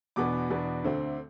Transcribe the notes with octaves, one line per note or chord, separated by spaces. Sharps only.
E2 B2 B3 D4 D6
E2 B2 B3 D4
D2 D3 A3 C4